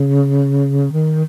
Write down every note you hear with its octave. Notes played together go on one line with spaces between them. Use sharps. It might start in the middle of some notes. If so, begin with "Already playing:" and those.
Already playing: C#3
D#3